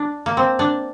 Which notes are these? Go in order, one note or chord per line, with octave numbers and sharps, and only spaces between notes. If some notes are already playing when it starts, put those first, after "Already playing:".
Already playing: D4
A#3
C4
D4